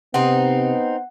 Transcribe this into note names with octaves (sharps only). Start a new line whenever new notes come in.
C3 B3 C4 D#4 F#5